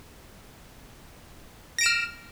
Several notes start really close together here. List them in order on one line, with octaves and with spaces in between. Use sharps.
A#6 D7 E7 F6